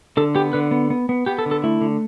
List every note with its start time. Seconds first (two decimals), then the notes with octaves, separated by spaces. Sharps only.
0.17 D3 A4
0.35 B3 G4
0.53 D3 B4
0.71 B3
0.90 B3
1.09 B3
1.26 B3 G4
1.39 A4
1.46 D3
1.51 A4
1.64 A3 E4
1.81 D3